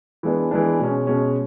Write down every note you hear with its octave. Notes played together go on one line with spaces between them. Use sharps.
E3 G#3 B3 D4
E3 G#3 B3 D4
B2 G#3 C#4
B2 G#3 C#4